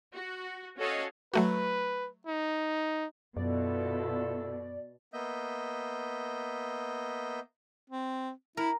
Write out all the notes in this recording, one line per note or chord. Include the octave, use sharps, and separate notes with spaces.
F#4
C#4 F#4 A4 C#5 D#5 F5
F#3 A3 F#4 B4
D#4
F#2 B2 E4 F4 A4 D5
A#3 B3 D#5 E5 G6
C4
E4 A#4